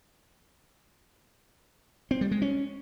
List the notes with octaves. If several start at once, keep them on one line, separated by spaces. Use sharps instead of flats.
C4
G3
G#3
C#4